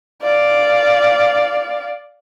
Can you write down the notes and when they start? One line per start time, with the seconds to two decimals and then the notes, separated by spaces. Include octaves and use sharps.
0.22 D5 F5